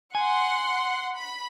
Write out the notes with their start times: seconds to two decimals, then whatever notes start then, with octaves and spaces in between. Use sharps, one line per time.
0.15 F#5 G#5 C6
1.15 B5